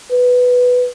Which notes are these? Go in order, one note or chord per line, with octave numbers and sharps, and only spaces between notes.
B4